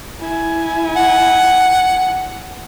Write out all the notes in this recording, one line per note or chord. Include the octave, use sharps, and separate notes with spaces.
E4 G#5
F#5